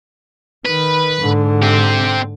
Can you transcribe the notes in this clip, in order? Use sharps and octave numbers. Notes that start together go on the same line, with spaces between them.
D#3 B4
G#2 D3
C4 G4